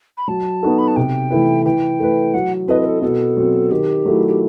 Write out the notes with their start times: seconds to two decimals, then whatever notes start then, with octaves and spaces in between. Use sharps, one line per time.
0.17 B5
0.28 F#3 A5
0.63 B3 D#4 F#4 A4
0.78 B5
0.88 A5
0.96 C3 G5
1.30 E3 A3 E4 B4
1.66 E3 G5
2.00 A3 E4 B4
2.34 F#3 F#5
2.68 C4 E4 A4 B4 D#5
2.81 B4
2.85 A4
3.02 B2 A4
3.37 F#3 C4
3.71 D#3 G4
4.05 F#3 A3 E4
4.28 G4